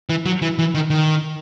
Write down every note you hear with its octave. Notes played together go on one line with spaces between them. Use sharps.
E3
F#3
E3
E3
D#3
D#3